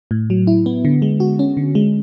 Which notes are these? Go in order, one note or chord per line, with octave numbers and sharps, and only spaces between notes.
A2
F#3
E4
B3
D3
G#3
F#4
C#4
D3
G#3